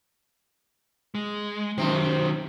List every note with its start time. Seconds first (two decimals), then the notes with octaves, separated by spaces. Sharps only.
1.15 G#3
1.78 F#2 C3 D#3 F#3 C4